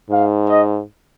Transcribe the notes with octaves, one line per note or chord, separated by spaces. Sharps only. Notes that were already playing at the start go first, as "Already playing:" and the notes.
G#2 F5
D#5